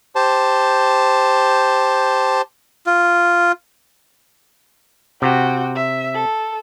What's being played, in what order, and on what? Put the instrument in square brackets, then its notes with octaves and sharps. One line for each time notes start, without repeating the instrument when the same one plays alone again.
[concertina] G4 C5 A5
[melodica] F4
[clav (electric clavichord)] C3 [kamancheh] F#4 G5
[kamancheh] E5
A4